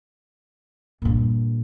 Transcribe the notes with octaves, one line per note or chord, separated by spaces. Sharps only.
G2 A#2